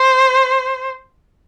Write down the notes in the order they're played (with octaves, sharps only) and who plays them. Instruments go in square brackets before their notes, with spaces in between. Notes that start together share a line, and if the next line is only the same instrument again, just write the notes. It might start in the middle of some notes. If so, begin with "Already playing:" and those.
Already playing: [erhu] C5